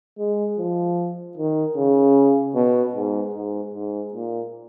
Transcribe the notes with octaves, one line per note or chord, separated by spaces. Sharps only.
G#3
F3
D#3
C#3
B2
G#2
G#2
G#2
A#2